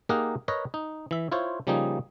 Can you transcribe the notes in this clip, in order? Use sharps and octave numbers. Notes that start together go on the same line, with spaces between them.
A#3 D#4 G4 G#4 A#4 F#5
A#4 B4 C#5 D#5 A#5
D#4
E3 E5
E4 F4 C5 C#5
C#3 F3 G3 A#3 D#4 G#4